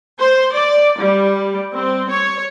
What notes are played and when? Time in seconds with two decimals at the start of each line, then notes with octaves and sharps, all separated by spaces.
0.19 C5
0.52 D5
0.98 G3
1.74 C4
2.09 C#5